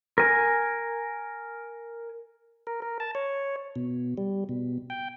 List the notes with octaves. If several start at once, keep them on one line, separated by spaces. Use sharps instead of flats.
A#4 G#5
A#4
A#4
A5
C#5
B2
G3
B2
G5